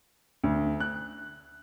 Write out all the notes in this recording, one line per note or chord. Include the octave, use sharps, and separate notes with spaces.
D2
F#6